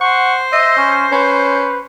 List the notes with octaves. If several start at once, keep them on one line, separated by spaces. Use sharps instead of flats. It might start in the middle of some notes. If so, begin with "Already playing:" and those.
C5 F#5 C#6
D#5 E5
C#4
C#4 B4